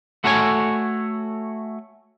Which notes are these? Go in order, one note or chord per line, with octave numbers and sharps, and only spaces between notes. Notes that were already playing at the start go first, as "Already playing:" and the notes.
A3 F#4 A4 C#5 G#5